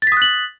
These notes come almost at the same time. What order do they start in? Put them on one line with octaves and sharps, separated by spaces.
A6 B6 D#6 F#6 F#7